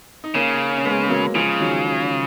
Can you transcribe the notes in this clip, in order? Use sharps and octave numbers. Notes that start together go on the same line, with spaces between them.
D#4
C#3 A#3 C#4
C#4
G#3 B3
F#3 A#3
C#3 F3 G#3
D#3 F#3